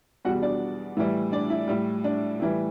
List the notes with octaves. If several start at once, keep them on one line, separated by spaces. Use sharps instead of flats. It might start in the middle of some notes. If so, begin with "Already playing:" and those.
E2 B2 G3 F#4 F#5
D4 D5
A2 E3 G3
D4 D5
E4
A2 G3
D4
A2 E3 G3